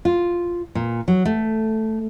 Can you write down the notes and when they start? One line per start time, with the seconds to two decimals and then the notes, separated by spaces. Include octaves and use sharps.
0.05 F4
0.75 A#2
1.08 F#3
1.25 A3